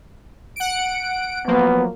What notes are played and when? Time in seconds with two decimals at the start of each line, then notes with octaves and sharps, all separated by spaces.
0.56 F#5 D7
1.47 F3 F#3 A#3 B3